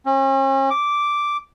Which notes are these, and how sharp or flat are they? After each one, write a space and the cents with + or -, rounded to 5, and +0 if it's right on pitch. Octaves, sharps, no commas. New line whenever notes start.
C#4 -40
D6 -5